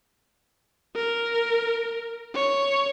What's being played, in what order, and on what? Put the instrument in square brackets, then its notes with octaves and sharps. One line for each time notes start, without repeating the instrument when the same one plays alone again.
[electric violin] A#4
C#5